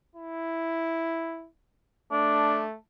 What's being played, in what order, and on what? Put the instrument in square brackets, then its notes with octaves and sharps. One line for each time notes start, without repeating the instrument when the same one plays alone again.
[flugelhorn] E4
[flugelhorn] A3 [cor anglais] D4